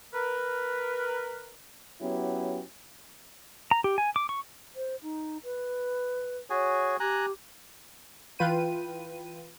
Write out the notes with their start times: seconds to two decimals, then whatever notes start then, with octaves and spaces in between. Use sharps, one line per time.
0.14 A#4 B4
2.01 F#3 B3 C#4 E4 G4
3.71 A#5
3.84 G4
3.98 G#5
4.16 D6
4.29 C#6
4.76 C5
5.02 D#4
5.44 B4
6.50 F#4 G#4 C#5 G#5
7.00 G4 G#5 A#5 F#6
8.39 E3 F4 B4 G5 D#7